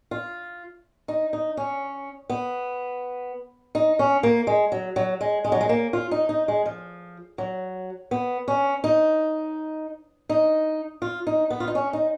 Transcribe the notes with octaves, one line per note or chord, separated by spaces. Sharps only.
F4
D#4
D#4
C#4
B3
D#4
C#4
A#3
G#3
F#3
F#3
G#3
G#3
F#3
G#3
A#3
F4
D#4
D#4
G#3
F3
F#3
B3
C#4
D#4
D#4
F4
D#4
B3
F4
D#4
C#4
D#4